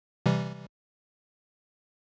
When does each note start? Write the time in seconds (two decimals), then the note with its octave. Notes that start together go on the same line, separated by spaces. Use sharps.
0.26 C3 E3 G3